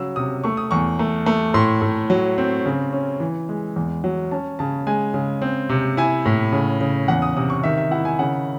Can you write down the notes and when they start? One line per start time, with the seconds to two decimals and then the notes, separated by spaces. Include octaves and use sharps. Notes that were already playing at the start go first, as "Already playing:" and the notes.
Already playing: C#3 F#3 E6
0.16 C3 D#6
0.44 A3 C#6
0.57 D#6
0.71 E2 C#6
0.99 A3
1.26 A3
1.54 A2 C6
1.82 A2
2.10 F#3
2.38 C4
2.65 C#3
2.93 C#4
3.20 E3
3.49 G#3
3.76 E2
4.04 F#3
4.31 C#4 A5
4.59 C#3 A5
4.87 G#3 G#5
5.14 C#3
5.42 C4
5.69 C3
5.97 E4 G#5
6.26 A2
6.52 C#3
6.81 C#3
7.08 E2 F#5
7.22 D#6
7.37 C3 D#6
7.50 C#6
7.64 D#3 E5
7.78 E5
7.91 E4 F#5
8.05 G#5
8.19 C#3 F#5